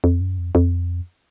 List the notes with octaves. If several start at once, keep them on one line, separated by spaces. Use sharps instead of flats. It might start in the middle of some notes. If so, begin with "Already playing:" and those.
F2
F#2
F2
F2